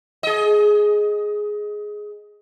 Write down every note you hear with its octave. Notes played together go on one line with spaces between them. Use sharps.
G#4 D#5